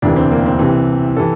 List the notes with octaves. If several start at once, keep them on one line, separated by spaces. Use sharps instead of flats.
E1 D2 C3 E3 D4
C4
A#3
C4
C2 C3 E3
C3 E3 A4